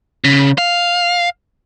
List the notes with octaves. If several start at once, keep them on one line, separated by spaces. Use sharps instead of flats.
C#3
F5